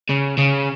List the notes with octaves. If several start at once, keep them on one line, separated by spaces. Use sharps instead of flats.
C#3
C#3